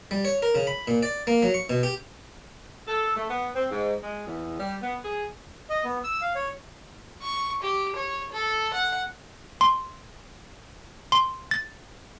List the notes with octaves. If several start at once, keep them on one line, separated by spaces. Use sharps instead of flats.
G3
C#5
A#4
C#3
B5
A#2
D5
A#3
F#3
C#6
B2
G4
A4
A3
B3
C4
G#2
G#3
E2
G3
B3
G#4
D#5
B3
E6
F5
C#5
C#6
G4
C#5
A4
F#5
C6
C6
A6